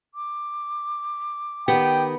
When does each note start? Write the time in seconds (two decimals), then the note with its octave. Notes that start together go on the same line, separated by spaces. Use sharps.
0.15 D6
1.68 D#3 B3 G4 G5